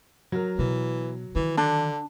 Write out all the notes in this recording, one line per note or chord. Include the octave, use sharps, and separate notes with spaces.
F#3 A#4
B2 E3
D#3 E3
D3 D4